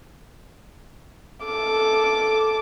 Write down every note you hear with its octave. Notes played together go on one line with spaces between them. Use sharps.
A4 D6